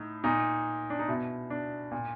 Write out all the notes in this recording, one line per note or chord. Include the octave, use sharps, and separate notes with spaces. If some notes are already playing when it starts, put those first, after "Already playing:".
Already playing: A2 D#4
A#2 D#4
D4
D#4
B2 E4
D4
A#2